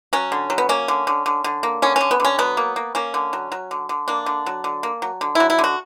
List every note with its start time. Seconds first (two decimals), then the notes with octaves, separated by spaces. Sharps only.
0.13 F#3 C#4
0.32 D3
0.50 F#3
0.58 B3
0.69 A#3 C#4
0.88 D3
1.07 D3
1.26 D3
1.44 D3
1.63 A#3
1.82 D3 C#4
1.96 D3 C#4
2.11 B3
2.20 D3 C#4
2.38 F#3 B3
2.57 A#3
2.76 A#3
2.95 A#3 C#4
3.14 D3
3.33 F#3
3.52 F#3
3.71 D3
3.89 D3
4.08 A#3 D4
4.26 D3
4.46 F#3
4.64 D3
4.83 A#3
5.02 F#3
5.21 D3
5.35 F#3 E4
5.50 E4
5.59 D3
5.64 F#4